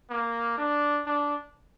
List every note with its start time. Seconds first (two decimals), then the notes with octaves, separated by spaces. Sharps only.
0.10 A#3
0.58 D4
1.06 D4